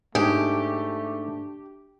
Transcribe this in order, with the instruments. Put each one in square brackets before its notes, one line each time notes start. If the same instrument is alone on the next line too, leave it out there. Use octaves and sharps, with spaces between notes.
[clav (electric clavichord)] G#2 G#4 [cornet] A3 [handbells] D4 [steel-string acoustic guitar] G4